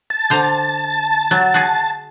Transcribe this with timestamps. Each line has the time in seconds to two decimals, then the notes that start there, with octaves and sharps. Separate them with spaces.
0.10 A5
0.30 D3 C5 A#5
1.31 F#3
1.54 F#4 G#4